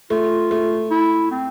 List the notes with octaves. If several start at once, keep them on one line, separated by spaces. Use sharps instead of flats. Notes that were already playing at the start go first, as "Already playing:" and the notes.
A3 F4
A3
E4
C4